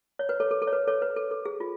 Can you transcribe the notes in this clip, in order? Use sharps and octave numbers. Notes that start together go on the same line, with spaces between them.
C#5
B4
A4 C#5
A4
A4
C#5
B4
A4 C#5
B4
A4
A4
G#4
F4